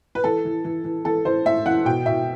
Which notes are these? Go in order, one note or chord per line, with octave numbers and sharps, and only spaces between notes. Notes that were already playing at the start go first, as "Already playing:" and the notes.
B4
E3 A4
E3
E3
E3
E3 A4
E3 C5
A2 E5
E3 F#5
B2 G5
B2 E5